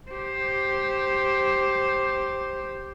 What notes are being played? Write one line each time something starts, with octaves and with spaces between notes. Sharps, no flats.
G4 C5